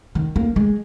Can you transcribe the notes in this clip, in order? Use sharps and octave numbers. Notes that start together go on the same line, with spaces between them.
D#3
A#3
G#3